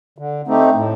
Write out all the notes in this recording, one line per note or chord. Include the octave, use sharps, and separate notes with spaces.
D3
A3 C4 D#4 G4
A2